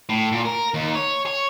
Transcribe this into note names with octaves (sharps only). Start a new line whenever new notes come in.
A2
A#2
A#4
D#2
C#5
C#5